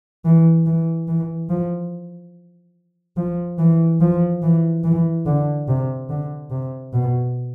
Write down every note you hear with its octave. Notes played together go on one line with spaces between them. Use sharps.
E3
E3
E3
F3
F3
E3
F3
E3
E3
D3
C3
D3
C3
B2